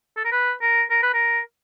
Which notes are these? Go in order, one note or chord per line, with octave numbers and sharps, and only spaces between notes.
A4
A#4
B4
A#4
A#4
B4
A#4